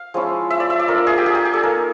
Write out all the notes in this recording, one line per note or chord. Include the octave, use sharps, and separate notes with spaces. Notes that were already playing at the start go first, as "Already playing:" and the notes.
Already playing: F5
F3 G#3 C#4 E4
E5
D5
E5
D5
A3 D4 F4 A#4
G#4
G4
G#4
G4
G#4
A4
A#3 D#4 A#4